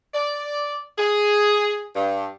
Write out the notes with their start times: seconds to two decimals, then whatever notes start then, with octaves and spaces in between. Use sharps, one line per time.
0.14 D5
0.98 G#4
1.96 G2